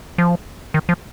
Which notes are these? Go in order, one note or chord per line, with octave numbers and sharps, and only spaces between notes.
F3
D#3
F3